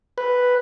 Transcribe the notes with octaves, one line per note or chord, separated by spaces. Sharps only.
B4